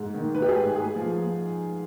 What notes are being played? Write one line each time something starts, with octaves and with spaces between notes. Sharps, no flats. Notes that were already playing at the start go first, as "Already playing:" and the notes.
Already playing: G#2
D#3
D#3 B4
G4
G#4
G#2
G#2 G#4
F3
F3